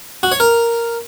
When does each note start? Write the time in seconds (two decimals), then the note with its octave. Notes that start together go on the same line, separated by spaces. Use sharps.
0.23 F#4
0.32 C#5
0.40 A#4